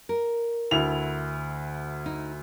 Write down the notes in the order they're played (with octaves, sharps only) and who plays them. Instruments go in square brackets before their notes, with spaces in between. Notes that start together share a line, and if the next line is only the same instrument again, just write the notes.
[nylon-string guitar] A#4
[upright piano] D2 E4 F7
[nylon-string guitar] D#4